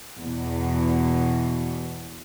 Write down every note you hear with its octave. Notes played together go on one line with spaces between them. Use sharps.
E2 B2